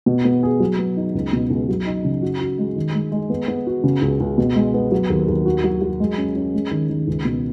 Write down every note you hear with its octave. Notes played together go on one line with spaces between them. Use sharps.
B2
B3
G#4
F#3
B3
D#4
C#2
B2
C#2
F#3
D#4
C#3
F#4
F#4
G#3
D#3
G#3
G#3
B3
B3
F#4
C#3
C#2
C#2
B2
G#3
B3
F#3
D#2
D#2
F#4
F#3
F#3
G#3
C#4
C#4
G#3
D#3
D#3
C#2
B2